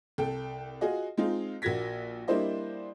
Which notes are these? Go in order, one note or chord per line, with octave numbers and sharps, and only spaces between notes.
C2 A4 G5
F4 F#4 G#4 D#5
G#3 C4 D#4 F4
A#1 A#3 F#4 G#6 A#6 B6
G3 A#3 D4 E4 C5 D#5